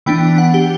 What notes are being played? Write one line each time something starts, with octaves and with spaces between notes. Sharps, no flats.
E3 B3 D4 G5
F#5
G4